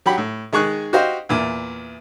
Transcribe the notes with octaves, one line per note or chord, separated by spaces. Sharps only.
F#3 G4 F#5 B5
A2
D#3 G#3 G#4 C#6 F#6
F#4 G4 C5 D#5 F5
E2 A#2